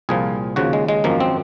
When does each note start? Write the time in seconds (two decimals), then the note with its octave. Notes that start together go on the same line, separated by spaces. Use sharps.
0.09 C2 A#2 F3 G#4
0.56 D#2 C#3 F3 F#4
0.73 G#3
0.89 G#3
1.04 G#1 F#2 F3 A#3
1.20 C4